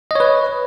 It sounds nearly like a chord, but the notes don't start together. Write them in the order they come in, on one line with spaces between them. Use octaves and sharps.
D#5 C#5 B4